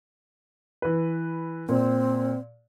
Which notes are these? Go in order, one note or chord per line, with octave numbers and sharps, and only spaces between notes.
E3 B4
A#2 C4